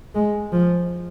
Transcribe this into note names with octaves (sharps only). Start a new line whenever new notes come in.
G#3
F3